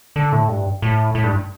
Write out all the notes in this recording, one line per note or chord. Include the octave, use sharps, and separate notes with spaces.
D3
A2
G2
A2
A2
G2